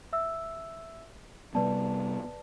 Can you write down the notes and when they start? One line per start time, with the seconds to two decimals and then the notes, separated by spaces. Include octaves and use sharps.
0.13 E5 E6
1.55 C3 G3 B3 B4 D5 A5